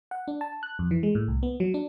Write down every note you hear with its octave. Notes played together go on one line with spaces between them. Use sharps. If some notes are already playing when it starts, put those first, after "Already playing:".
F#5
D4
A5
F#6
F2
E3
G#3
A2
C2
B3
F#3
D4